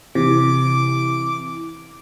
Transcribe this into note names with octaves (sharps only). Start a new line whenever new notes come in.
C3 E3 D6